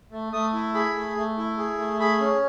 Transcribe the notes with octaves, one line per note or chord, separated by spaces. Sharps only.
A3
A3 D#6
E4
G#4 B5
A3
A3
E4
G#4
A3
G#4 B5
C#4